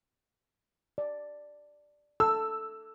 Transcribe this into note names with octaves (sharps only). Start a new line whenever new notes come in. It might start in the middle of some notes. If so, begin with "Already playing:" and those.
D5
A4 E6